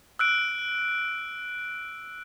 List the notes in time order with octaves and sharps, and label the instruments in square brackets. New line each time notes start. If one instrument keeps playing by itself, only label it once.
[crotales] E6 F#6 D7